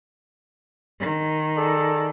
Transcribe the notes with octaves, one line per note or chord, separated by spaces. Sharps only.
D#3
G#4 A4 D5